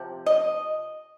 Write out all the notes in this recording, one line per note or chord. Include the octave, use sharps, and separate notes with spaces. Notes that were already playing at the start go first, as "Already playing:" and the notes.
Already playing: C3 F3
D#5